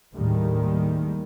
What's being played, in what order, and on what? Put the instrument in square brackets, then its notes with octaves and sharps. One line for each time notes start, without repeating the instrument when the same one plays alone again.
[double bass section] D#2 A2 D#3 G3 G#3